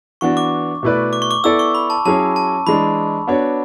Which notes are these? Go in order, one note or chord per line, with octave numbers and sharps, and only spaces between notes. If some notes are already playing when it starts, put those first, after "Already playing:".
E3 B3 D4 F#4 C#6
D6
B2 A3 E4 B4 D5
D6
C#6
D6
B3 E4 A4 D5 E6
C#6
B5
A5
F#3 C#4 E4 G#4 C#5 A5
A5
E3 G#3 D4 B5
B3 D4 F#4 C#5